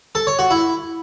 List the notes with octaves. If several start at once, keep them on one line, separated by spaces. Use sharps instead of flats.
A4
C#5
F#4
E4